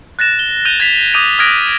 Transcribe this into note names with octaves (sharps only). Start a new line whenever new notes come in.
F#6 A6 A#6 E7
G7
F#6 G6 A#6 D#7 F7 G7
G#6 A6 B6 F7
D6 D#6 G6 D#7 F7
D#6 F6 F#6 G#6 A#6 D7